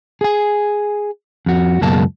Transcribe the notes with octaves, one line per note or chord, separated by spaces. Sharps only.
G#4 G#5
F2 F#4
C#2 F#2 B2 G#3 A#3 A5